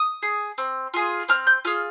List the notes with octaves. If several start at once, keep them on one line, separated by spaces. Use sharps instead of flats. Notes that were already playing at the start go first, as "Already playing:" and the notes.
Already playing: D#6
G#4
C4
F4 G#4
C4 F6
G6
F4 G#4 F6